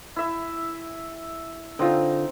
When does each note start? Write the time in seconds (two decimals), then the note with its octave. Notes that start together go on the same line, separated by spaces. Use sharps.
0.16 E4 E5
1.79 D3 C4 D#4 F4